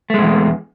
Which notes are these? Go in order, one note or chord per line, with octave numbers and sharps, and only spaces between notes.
E2 G#2 G#3 A3